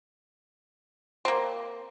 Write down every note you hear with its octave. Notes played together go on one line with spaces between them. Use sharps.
A#3 C4